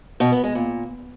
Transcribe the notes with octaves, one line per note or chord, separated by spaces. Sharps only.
B2
B3
G#3
A#2